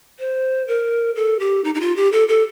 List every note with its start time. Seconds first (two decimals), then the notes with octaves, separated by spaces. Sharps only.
0.19 C5
0.68 A#4
1.16 A4
1.40 G4
1.64 D#4
1.75 D#4
1.81 F4
1.96 G4
2.12 A4
2.28 A4